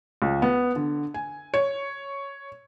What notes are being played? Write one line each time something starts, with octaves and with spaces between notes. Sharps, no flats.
C#2
B3
D3
G#5
C#5